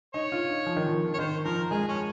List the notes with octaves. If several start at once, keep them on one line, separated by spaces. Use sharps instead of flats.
D#4 C#5
F4
D#4
F3
D#3
F3
C#5
D#3 C5
F3 A#4
G#3 G#4
C#4